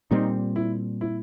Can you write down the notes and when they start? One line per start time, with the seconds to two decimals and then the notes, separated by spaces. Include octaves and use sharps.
0.11 A#2 G3 C4 D#4
0.56 E4
1.01 E4